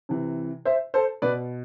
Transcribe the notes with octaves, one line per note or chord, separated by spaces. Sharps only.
C3 E3
C5 E5
A4 C5
B2 B4 D5